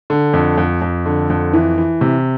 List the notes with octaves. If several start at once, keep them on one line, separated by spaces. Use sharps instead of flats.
D3
F2
F2
F2
D3
F2
E3
E3
C3